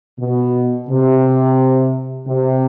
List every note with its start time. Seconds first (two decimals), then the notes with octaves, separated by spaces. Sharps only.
0.19 B2
0.89 C3
2.27 C3